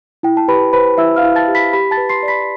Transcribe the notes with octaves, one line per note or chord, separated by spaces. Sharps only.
E4 G5
A5
G4 B4 B5
B4 C5 B5
E4 E5 E6
F5 F6
E4
A5 A6
G4
B5 B6
G4 B5 B6
A5 A6
B4
C6 C7
D5
B5 B6